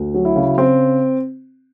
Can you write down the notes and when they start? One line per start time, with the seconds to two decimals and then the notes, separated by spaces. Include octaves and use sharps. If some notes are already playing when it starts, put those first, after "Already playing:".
Already playing: D2
0.14 F#3
0.25 E4
0.36 C#3
0.58 C#3 C4